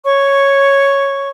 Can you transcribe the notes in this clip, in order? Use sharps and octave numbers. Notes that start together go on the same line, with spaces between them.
C#5 C#6